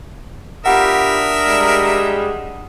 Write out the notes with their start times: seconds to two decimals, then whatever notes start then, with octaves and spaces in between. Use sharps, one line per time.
0.66 B3 D4 F4 G4 A#4 E5 F#5 D#6
1.47 G3 G#3